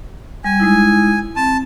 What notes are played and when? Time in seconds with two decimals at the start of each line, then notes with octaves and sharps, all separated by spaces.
0.44 G3 G#5
0.60 G#3 D#4 E4
1.36 C4 A5